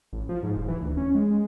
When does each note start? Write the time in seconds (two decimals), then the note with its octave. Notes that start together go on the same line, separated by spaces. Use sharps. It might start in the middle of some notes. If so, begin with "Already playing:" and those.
0.13 A1
0.29 F3
0.43 G#2
0.57 D#1
0.68 E3
0.82 D2
0.97 C#4
1.15 G#3
1.31 G#3